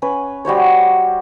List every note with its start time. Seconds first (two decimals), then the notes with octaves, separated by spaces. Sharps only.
0.02 C#4 B4
0.45 G3 F#4 C5 C#5